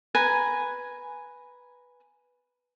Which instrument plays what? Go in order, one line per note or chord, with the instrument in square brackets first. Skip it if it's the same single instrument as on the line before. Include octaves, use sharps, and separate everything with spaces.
[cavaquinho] B4 G#5 A#5